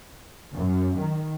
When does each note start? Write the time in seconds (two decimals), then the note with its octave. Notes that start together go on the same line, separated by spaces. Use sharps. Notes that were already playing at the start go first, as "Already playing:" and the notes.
0.56 F#2
0.99 D#3